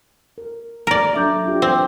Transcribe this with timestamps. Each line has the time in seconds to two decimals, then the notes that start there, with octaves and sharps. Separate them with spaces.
0.38 A#4
0.87 A#3 A#4 D5 A#5
1.14 F#3 D4 A4 E5 D6 G6
1.45 D4 F4 G4
1.62 C4 D6